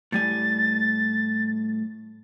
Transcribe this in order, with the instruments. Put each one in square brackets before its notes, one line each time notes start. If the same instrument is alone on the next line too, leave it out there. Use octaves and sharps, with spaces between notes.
[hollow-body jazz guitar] A2 G3 G#5 [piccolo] A6